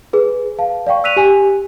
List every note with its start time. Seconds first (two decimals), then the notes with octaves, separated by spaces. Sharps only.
0.13 G#4 B4
0.59 F5 A5
0.87 D5 F5 G5 C#6
1.04 E6 F#6 B6 D#7 F7
1.17 G4 G#5